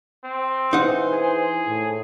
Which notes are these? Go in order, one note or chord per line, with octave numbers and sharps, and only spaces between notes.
C4
E3 D#4 C5 F#5
G#4
A2